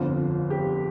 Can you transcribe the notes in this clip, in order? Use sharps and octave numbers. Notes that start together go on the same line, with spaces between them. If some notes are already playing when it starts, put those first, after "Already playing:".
Already playing: G1 F2 D3 F4
G4